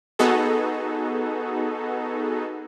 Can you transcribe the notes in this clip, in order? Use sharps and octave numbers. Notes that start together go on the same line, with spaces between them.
B3 D#4 F#4 G#4 A4